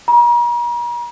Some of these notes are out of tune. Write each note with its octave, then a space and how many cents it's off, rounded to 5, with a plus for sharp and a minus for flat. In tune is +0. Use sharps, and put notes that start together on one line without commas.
A#5 +40